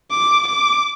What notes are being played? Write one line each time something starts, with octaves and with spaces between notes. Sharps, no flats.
D6
D6